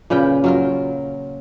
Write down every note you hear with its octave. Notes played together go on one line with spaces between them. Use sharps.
A#2 C#3 B4 G5
F#3 F4 A#4